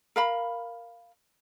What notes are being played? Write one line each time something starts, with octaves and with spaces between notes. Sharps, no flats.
A#4 F5 B5